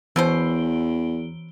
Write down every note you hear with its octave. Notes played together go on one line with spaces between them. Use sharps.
E2 B2 E3 C#4 C5 D7 G7